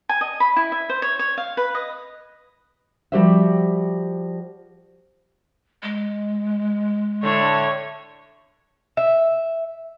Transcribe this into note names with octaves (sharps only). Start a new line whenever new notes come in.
G#5
D#5
B5
E4
E5
C5
C#5
C#5
F5
B4
D#5
F3 G3 F#4 G4 C5 E5
G#3
A2 D3 C#5
E5